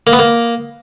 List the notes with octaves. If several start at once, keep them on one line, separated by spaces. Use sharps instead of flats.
A#3
B3
A#3